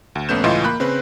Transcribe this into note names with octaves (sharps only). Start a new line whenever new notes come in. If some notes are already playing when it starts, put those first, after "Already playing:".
D2
A#1 A3 B3 C#4 G6 E7
C#2 A2 E3 F4 D#5 C6
A#3 B5 F#6
C#3 C4 B4